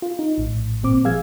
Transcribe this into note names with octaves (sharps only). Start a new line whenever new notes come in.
F4
D#4
A#1 A2
G1 A#2 C4 D6
F3 G3 G#4 F5 E6 G#6